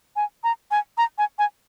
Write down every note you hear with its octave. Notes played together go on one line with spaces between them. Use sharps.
G#5
A#5
G#5
A#5
G#5
G#5